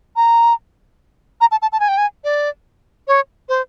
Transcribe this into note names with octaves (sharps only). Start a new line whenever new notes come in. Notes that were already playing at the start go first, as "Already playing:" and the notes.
A#5
A#5
A5
A5
A5
G#5
G5
G#5
D5
C#5
C5